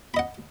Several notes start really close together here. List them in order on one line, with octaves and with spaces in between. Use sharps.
B5 D#5 F#5